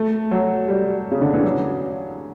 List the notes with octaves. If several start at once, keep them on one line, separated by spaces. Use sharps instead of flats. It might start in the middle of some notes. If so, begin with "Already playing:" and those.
Already playing: A3
F#3
G3
C#3
D3
E3
F#3